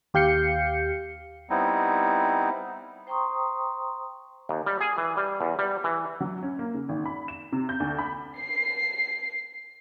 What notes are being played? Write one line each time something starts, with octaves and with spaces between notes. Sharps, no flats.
D#2 G4 F5 G6 C7 C#7
G3 B3 C4 D#4 E4
C5 G5 A#5 C6 C#6 D#6
D#2
G3
G#4
E3
G3
E2
G3
E3
F#3
C#4
A#3
C#3
G#1
B5
E7
C3
G6
D2
B5
C7